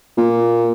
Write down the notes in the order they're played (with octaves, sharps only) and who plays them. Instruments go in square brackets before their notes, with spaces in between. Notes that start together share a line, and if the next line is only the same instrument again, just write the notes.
[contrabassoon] A#2